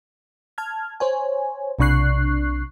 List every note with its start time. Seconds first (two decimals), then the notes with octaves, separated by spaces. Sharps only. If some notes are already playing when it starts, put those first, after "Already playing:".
0.58 A5 F6 G#6
1.00 C5 C#5 G#5
1.79 B1 C3 D4 C#6 F#6 C7